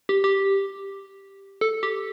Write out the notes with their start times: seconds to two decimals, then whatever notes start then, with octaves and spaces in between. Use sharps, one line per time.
0.09 G4
0.24 G4
1.61 A4
1.83 G4